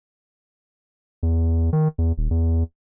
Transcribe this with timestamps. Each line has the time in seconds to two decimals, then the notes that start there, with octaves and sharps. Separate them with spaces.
1.23 E2
1.73 D#3
1.98 E2
2.18 D#1
2.31 E2